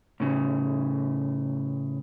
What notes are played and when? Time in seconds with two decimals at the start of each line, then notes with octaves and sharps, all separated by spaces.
0.20 A2 C#3